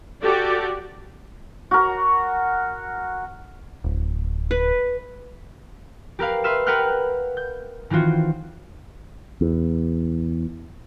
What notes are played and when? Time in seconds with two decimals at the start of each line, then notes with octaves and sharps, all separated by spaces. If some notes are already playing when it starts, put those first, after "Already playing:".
0.22 F#4 G4 A4 D5
1.71 F#4 A#4
3.84 D1
4.51 B4
6.19 G4 A#4 B4 F5
6.44 B4 E5 C6 F6 E7
6.66 A#4 B4 F#5 G5 F6 F#6
7.37 G6
7.90 D#3 E3 C4 F4 F#4
9.41 E2